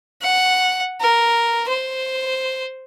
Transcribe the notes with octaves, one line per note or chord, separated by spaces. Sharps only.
F#5
A#4
C5